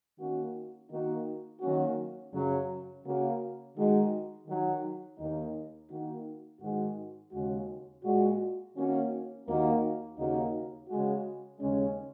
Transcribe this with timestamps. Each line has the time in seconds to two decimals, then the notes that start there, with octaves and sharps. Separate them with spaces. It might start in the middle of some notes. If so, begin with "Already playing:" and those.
0.18 D#3 A#3 C#4 F#4
0.89 D#3 A#3 D#4 F#4
1.60 D#3 F#3 A#3 C#4 F#4
2.32 F#2 C#3 F#3
3.03 C#3 A#3 F#4
3.74 D#3 G#3 D#4 F#4
4.46 D#3 F#3 D#4
5.17 D#2 D#3 A#3 D#4
5.89 D#3 A#3 D#4 F#4
6.60 G#2 D#3 G#3 F#4
7.32 D#2 C#3 G#3 F#4
8.02 A#2 G#3 F#4
8.74 D#3 A#3 C#4 F#4
9.45 D#2 D#3 A#3 D#4 F#4
10.17 D#2 C#3 A#3 D#4 F#4
10.88 C#3 G#3 F#4
11.60 D#2 C#3 G#3 C#4